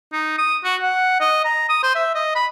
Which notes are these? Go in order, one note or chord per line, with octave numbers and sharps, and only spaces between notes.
D#4
D#6
F#4
F#5
D#5
A#5
D#6
C5
E5
D#5
B5